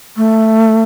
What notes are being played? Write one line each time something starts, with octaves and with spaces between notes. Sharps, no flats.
A3